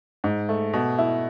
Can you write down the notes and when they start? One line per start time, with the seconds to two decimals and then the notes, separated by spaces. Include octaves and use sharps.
0.24 G#2
0.49 A3
0.73 B2
0.99 E4